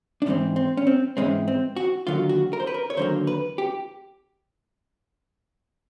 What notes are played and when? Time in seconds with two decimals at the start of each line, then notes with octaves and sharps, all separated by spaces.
0.22 D4
0.26 G#2 E3 G#3 C4 C#4
0.56 C4
0.77 C#4
0.87 C4
1.17 G#2 E3 G#3 C4 C#4
1.48 C4
1.77 F#4
2.07 D#2 D3 F#3 A#3 F4
2.29 F#4
2.53 A#4
2.60 C5
2.67 B4
2.74 A#4
2.90 C#5
2.97 D#2 D3 F#3 A#3 C5
3.27 B4
3.58 G4